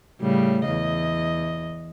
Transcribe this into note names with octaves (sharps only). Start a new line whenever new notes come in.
A2 C#3 G3
E2 D#5